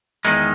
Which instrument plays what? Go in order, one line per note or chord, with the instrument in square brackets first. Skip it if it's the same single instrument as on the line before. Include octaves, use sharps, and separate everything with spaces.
[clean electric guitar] E2 D#3 G#3 D#4